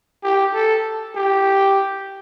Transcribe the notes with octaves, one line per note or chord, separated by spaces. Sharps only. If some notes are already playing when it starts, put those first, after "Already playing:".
G4
A4
G4